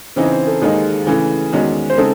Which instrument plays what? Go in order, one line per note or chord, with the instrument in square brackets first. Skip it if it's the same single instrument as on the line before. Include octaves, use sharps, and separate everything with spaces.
[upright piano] C#3 E3 C4 D#4 [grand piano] C5
[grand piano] C5
A4
[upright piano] D#2 D#3 G#3 D#4 [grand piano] G#4
[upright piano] C#3 E3 A3
E2 D#3 G#3 C#4 F#4
[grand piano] C5
[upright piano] C#3 G#3 C4 D#4 [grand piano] A4